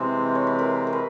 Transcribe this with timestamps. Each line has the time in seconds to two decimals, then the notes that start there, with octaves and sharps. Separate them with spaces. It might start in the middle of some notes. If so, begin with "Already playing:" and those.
Already playing: C3 E3 G#3 C4 C5
0.35 C#5
0.47 B4
0.59 A#4
0.87 A#4
0.93 B4